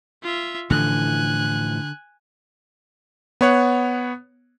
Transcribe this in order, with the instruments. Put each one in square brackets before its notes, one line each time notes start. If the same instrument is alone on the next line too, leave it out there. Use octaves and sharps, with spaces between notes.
[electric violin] F4 E5
[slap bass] A2 E3 F3 [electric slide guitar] D3 [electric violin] G#5 F#6
[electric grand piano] B3 C#5 F#5